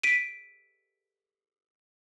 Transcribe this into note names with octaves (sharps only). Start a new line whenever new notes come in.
B6 D7 D#7